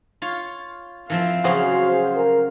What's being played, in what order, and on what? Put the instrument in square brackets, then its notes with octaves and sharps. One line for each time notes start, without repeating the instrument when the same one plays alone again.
[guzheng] F4 C#5 F5
[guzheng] E3 F3 C4 [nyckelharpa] F5
[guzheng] C#3 F#3 [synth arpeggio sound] F#4 G#4 C5
[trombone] A#4